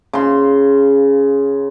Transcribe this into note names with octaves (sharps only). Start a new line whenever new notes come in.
C#3 C6